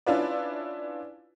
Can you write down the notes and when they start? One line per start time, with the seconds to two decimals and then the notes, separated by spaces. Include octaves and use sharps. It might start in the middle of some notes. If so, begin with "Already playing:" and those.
0.06 C#4 D4 E4 F4 B4 D5